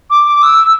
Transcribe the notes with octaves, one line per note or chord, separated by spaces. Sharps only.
D6
E6